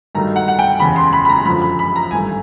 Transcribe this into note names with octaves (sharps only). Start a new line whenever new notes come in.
G2 D#3 F#3 A3 A#5
F#5
F#5
G5
F#1 E2 C#3 B5
C6
B5
B5
A#5
F#2 D3 F3 B5
B5
B5
A#5
G#1 G2 E3 A3 G#5